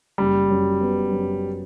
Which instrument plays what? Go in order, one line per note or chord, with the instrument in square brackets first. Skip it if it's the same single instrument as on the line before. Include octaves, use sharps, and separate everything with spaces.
[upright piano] F#1 [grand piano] G3
[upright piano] F#2
B3
F#2